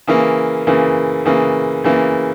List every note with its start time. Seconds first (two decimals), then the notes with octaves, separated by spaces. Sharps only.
0.07 C#3 E3 A#3
0.67 C#3 E3 A#3
1.25 C#3 E3 A#3
1.84 C#3 E3 A#3